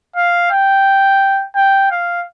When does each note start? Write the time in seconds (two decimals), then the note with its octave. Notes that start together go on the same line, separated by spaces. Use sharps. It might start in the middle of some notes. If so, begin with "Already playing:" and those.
0.16 F5
0.51 G5
1.55 G5
1.91 F5